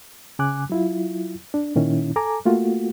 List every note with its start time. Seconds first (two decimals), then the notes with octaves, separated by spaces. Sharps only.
0.39 C#3 G#5 D6 F#6
0.70 F#3 E4 F4
1.54 D4
1.76 A#2 D#3 C#4 E4
2.16 A4 G#5 A#5 D6
2.46 A3 A#3 F4 F#4